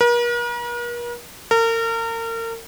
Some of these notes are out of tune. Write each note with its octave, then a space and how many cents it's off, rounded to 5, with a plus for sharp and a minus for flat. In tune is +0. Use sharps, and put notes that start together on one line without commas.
A#4 +45
A#4 -35